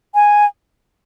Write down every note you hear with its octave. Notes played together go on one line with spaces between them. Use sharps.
G#5